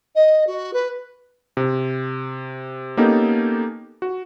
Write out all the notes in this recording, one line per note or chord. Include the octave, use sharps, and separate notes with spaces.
D#5
F#4
B4
C3
A#3 B3 C#4 D#4 G4 A4
F#4